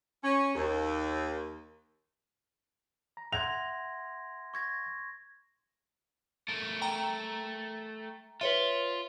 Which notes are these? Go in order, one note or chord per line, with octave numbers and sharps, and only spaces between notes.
C#4
D#2
A#5
E5 F#5 C6 G#6 A#6 F7
C#6 G#6 A#6
A3 A#4
G5 A#5
F4 B4 C#5 E5